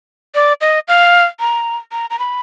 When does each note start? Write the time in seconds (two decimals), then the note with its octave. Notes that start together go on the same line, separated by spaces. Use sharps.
0.35 D5
0.61 D#5
0.88 F5
1.40 A#5
1.92 A#5
2.10 A#5
2.19 B5